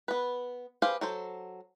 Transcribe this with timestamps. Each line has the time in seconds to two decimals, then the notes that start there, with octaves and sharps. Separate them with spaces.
0.08 B3 B4
0.82 G4 G#4 B4 C5 F5
1.01 F#3 A4 C5